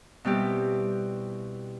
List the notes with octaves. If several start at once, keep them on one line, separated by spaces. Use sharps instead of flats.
B2 G3 C4 E4 G4